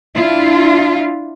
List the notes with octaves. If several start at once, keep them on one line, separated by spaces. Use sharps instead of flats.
D4 E4 F4